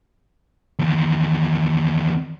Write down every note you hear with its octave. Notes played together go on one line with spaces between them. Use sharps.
E2 D#3